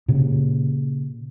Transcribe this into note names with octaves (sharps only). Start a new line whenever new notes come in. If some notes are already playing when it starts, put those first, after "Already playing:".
A#2 C#3